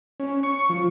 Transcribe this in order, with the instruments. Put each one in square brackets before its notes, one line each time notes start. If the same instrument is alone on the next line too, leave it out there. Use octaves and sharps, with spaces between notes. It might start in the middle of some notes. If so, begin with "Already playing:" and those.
[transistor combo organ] C#4
C#6
F3